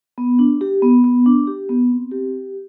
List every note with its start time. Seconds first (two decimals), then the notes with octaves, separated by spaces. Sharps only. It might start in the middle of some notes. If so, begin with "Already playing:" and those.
0.18 B3
0.39 D4
0.61 G4
0.82 B3
1.04 B3
1.26 D4
1.47 G4
1.69 B3
1.90 C4
2.12 G4